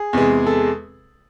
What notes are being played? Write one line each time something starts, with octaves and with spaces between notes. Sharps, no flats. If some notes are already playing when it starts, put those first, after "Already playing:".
Already playing: G#4
E2 C3 G#3
A4